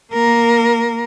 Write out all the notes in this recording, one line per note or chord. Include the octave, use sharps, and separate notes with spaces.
A#3 A#4